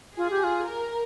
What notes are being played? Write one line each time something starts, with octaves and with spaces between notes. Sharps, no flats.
F4 G#4
G4
F4
A#4